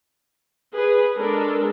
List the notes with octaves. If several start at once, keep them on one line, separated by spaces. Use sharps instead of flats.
G#4 B4
G#3 D4 A4 A#4